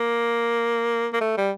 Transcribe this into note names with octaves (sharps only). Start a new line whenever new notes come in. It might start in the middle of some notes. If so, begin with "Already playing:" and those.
Already playing: A#3
A#3
A3
G3